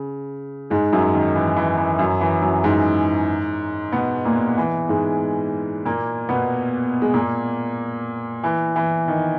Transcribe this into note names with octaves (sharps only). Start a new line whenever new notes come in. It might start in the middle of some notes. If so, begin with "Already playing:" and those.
Already playing: C#3
G#2 G#3
F#2 F#3
D#3
E3
E3
E3
F#2 F#3
E3
F#2 F#3
G#2 G#3
B2 B3
A#2 A#3
E3
G#2 G#3
A#2 A#3
B2 B3
G#3
A#2 A#3
E3
E3
D#3